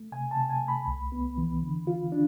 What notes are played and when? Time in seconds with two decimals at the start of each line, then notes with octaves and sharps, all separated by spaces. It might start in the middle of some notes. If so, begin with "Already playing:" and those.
Already playing: A3
0.12 C3 G#5
0.31 A5
0.36 C3
0.50 G#5
0.62 A3
0.68 B5
0.87 C2
1.12 B3
1.38 E3
1.62 D3
1.87 F4
2.12 D4